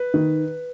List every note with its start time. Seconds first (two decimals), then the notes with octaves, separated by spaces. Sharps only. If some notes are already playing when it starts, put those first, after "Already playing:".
Already playing: B4
0.14 D#3